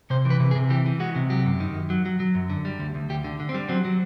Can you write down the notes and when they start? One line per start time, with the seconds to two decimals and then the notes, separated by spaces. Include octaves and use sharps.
0.10 C3 C5
0.25 E3
0.30 B4
0.40 C3
0.51 G#4
0.55 C3
0.70 E3 G4
0.86 E3
1.00 G#3 F#4
1.16 C3
1.30 F#3 G4
1.46 F#2
1.60 D#3
1.75 F#2
1.90 F#3
2.06 F#3
2.20 F#3
2.35 F#2
2.50 D3
2.65 G3
2.79 D2
2.95 D2
3.10 D2 G4
3.24 D3
3.40 D3
3.49 C4
3.54 G3
3.69 F#3 C4
3.85 F#3